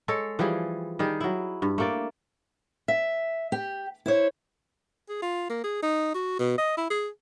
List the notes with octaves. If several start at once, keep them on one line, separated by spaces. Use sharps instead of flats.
G#3 A4 C#5
E3 F3 G3 G#4
D#3 G3 G#4
F#3 E4
G2
A3 A#3 D5
E5
G4
E4 C5 C#5
G#4
F4
A#3
G#4
D#4
F#4
B2
D#5
E4
G#4